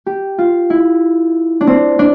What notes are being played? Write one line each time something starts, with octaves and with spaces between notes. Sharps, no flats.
G4
F4
E4
D4
C4
D4